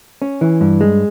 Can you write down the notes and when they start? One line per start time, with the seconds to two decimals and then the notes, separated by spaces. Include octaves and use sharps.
0.22 C#4
0.41 E3
0.61 G2
0.81 G#3